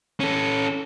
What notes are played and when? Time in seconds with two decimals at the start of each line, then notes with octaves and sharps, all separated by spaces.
0.20 C#4 A4